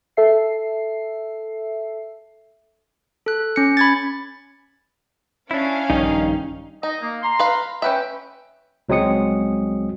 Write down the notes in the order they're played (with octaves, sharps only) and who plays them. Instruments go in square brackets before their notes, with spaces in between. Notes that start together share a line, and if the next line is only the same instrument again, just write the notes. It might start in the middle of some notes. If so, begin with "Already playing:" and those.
[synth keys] A4 E5 C7
[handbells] A4 F#6
C#4 C#7
B5 G#6 A6
[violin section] C#4 F5 [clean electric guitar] D4 E4
[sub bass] A#1 [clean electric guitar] G2 D#3 [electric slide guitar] D#4
[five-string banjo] D#4 [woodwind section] D#5
[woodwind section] A#3
A#5 C6
[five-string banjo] B4 F5
[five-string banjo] C#4 B4 E5 [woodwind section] G5
[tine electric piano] C#2 F#3 G#3 C4 D#6 C#7